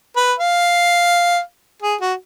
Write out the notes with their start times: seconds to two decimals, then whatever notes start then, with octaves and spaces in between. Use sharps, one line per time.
0.16 B4
0.39 F5
1.83 G#4
2.01 F#4